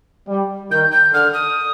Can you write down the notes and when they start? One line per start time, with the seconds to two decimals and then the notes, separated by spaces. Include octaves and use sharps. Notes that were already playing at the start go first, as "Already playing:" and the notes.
0.28 G3
0.71 D#3 G6
0.91 G6
1.12 D3 F6
1.33 D#6